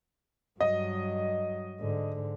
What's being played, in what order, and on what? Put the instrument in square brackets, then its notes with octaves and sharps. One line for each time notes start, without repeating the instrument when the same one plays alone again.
[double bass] G2 F#3 [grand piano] D#5
[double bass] G#2 D3